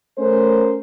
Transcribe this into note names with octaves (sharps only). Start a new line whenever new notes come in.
A3 C#4 A#4 C5